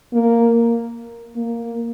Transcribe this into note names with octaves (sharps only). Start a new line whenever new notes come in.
A#3
A#3